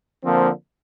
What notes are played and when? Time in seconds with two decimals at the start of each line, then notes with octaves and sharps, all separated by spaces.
0.23 D3 F3 A#3 C4